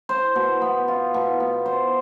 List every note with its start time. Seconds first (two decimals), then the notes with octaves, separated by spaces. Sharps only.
0.09 C5
0.35 B2
0.62 B3
0.88 F4
1.14 B2
1.40 B3
1.66 C5